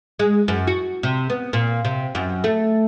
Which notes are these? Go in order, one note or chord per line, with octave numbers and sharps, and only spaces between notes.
G#3
F#2
F#4
C3
B3
A#2
C3
F#2
A3